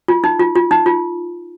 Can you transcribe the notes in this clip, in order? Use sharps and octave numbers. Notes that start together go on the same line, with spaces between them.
F4
D#4
F4
F4
D#4
F4